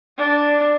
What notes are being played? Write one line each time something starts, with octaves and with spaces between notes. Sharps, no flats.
D4